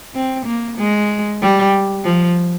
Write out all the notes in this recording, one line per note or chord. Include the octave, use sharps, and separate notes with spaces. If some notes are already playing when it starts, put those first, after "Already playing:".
C4
A#3
G#3
G3
F3